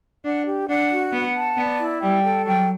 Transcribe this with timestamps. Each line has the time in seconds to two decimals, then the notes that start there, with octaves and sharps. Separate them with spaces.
0.25 D4 F#5
0.47 G4
0.69 D4 F#5
0.91 F#4
1.13 B3 F#5
1.35 A5
1.57 B3 D5
1.79 E4
2.01 G3 G5
2.24 A4
2.46 F#3 G5